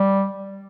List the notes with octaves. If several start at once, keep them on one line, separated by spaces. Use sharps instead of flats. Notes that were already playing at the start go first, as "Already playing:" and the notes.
Already playing: G3